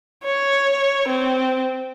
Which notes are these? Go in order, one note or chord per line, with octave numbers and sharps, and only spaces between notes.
C#5
C4